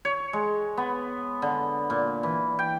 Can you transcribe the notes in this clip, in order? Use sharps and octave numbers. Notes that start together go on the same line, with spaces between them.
C#5
G#3
B3
D3
A#2
E3
G5